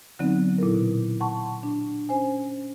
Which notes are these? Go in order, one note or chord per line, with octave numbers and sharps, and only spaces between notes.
D3 F#3 B3 C4 D#4
A#2 E4 A4 A#4
B2
F#5 A5 C6 C#6
D4
C#4 C5 G#5